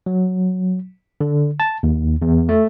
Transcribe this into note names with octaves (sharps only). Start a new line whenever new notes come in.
F#3
D3
A5
D#2
E2
A3